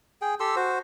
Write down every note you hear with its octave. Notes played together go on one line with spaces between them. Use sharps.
G#4 G5
G4 A4 C6 E6
F#4 C5